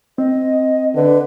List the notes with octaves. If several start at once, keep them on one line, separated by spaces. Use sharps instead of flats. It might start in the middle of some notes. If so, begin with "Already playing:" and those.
C4 D#5
D3 B4